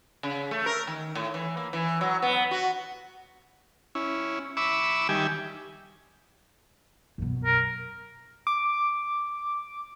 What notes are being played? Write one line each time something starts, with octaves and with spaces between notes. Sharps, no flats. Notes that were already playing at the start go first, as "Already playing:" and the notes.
C#3
A3
A#4
D#3
A2
E3
A#3
E3
F#3
B3
F#4
C#4 E4
E5 B5 C#6 D6 E6
D#3 G3 G4 E5 G#5
F#2 B2
A#4
D6